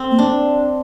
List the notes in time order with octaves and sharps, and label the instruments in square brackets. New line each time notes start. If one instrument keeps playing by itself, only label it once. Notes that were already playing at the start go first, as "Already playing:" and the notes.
Already playing: [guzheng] C4
[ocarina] A#3
[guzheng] D4